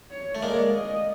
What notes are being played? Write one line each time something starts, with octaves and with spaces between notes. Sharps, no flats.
C#5
A3
G#3 A#3 D5
D#5